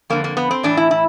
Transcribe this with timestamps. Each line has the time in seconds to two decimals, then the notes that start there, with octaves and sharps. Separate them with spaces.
0.10 F2 D3 A#3
0.24 A#3
0.37 B3
0.51 C4
0.63 A2 E3 D4
0.77 E4
0.91 E4